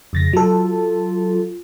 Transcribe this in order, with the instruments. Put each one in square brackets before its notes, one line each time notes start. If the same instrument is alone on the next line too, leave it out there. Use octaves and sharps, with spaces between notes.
[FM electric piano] F2 A6 A#6 [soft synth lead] C#3
[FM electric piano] F#3 A4 [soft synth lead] F4